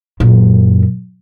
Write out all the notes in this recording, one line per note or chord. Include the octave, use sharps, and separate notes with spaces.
F#2 A#2